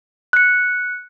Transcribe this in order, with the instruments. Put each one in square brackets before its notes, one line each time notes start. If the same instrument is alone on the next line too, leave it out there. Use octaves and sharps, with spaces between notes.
[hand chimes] F#6 C#7